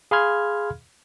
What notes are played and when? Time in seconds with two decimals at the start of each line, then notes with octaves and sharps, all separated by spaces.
0.11 G#4 F5 B5 C6 F6 G#6